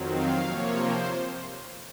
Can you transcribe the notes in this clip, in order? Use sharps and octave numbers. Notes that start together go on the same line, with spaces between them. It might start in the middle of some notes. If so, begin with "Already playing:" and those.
Already playing: F2 D#3 F#3 C4
F5
C3 F3 A#3 C#5
C5